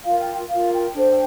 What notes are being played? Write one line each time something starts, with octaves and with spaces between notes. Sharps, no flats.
F4 A#4 F5
G5
F4 A#4 F5
G5
D4 A4 C5